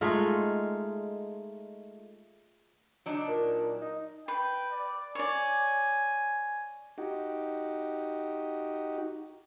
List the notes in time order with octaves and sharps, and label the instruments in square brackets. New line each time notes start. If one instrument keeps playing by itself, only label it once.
[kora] G#3 A3 D#4 F4
[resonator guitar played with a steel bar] F#3 D4 D#4
[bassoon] A#2
D#4
[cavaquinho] B4 [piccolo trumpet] G5
[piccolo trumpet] D5
[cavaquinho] C#5 D5 [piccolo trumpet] G#5
[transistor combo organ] D#4 F#4 G4